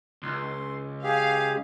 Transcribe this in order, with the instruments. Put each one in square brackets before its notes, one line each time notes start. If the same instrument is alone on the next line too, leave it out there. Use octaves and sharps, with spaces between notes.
[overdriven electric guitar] C#2 [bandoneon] C6
[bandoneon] G4 G#4 [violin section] F5